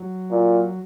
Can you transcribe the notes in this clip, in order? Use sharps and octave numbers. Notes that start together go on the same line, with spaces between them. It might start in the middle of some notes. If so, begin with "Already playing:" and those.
Already playing: F#3
A#2